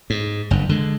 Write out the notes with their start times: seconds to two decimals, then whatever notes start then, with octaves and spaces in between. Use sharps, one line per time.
0.10 G#2
0.51 F#1 G2
0.69 D3 G#3